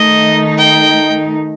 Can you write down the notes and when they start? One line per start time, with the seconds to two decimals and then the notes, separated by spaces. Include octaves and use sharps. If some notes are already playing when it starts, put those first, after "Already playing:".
Already playing: D#3 A3 D#4 D#5
0.58 G5